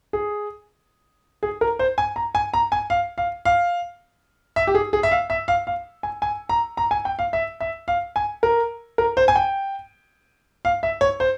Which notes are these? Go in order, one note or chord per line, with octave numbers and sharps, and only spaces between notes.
G#4
G#4
A#4
C5
G#5
A#5
G#5
A#5
G#5
F5
F5
F5
E5
G4
G#4
G#4
E5
F5
E5
F5
F5
G#5
G#5
A#5
A#5
G#5
G5
F5
E5
E5
F5
G#5
A#4
A#4
C5
G#5
G5
F5
E5
C#5
C5